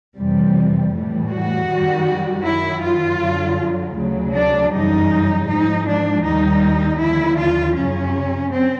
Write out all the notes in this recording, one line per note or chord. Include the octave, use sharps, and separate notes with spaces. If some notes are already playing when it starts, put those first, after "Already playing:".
F2 C3 E3 G3
A2 E3 G3
F#4
F#2 D#3 G3
F#2 D#3 F#3 E4
F4
F#2 D3 F#3
D2 C#3 F#3
D4
F#2 C#3 E3 G3 D#4
G#2 F3 D#4
D4
D#2 D#3 G3 D#4
D#2 D3 F3 E4
F4
F#2 C#3 F#3 C#4
C4